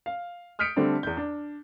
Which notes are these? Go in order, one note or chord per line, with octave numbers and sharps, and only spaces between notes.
F5
D#6 F6 G6 B6 C#7 D7
D3 G3 A3 C4 D4
E2 G6
D4